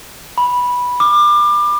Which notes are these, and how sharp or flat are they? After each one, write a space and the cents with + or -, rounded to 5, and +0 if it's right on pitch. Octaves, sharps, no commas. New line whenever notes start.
B5 -10
D6 +25